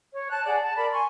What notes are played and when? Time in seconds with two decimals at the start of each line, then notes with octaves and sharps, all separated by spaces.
0.13 C#5
0.30 A5 F#6
0.45 G#4 D5 F#5
0.60 A5
0.76 A#4 D5 B5
0.92 G#5 C6 C#6